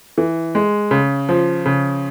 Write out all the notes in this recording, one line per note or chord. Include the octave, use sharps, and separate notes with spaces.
E3
G#3
C#3
F3
C#3